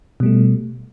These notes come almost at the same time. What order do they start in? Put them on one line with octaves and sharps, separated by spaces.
B2 G3 A3